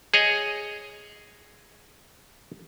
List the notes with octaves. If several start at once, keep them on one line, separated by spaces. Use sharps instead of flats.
G#4 C#5 D#5